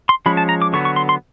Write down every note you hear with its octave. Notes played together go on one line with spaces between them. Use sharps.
C6
F3 G#3 C#4 B5
A5
A#5
D6
D3 F#3 B3 C#6
C#6
C6
C6